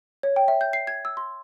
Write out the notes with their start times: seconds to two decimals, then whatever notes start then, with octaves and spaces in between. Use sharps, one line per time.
0.23 C#5
0.36 G5
0.48 E5
0.61 G6
0.73 C7
0.87 G#6
1.05 E6
1.17 C6